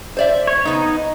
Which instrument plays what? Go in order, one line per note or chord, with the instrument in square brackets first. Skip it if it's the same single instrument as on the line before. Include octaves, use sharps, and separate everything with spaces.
[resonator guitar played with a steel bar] C5 D5 E5
[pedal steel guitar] C#5
[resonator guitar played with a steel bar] C#3 B3 [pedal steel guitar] D#4